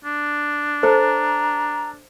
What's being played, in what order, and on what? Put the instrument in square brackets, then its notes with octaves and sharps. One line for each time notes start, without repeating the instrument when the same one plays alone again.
[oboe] D4
[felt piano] A4 [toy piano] C5 [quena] A#5